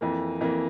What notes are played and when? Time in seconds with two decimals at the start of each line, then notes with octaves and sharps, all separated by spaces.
0.01 F2 E3 A#3
0.41 F2 E3 A#3